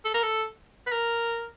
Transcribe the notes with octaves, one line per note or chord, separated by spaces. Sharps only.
A4
A#4
A4
B4
A#4